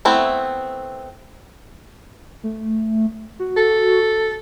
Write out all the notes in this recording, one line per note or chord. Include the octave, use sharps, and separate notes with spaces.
A3 B3 C4 E4
A3
F#4
A4